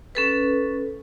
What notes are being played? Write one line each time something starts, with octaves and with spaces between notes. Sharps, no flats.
C#4 A4 B4